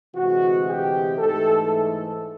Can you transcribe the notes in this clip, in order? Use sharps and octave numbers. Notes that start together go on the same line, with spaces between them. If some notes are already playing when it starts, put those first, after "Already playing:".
D2 C3 E3 G#3 F#4
G4
G#2 E3 A3 A4
A4